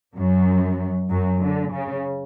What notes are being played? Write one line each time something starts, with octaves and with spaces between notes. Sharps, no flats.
F#2 F#3
F#2 F#3
D3
C#3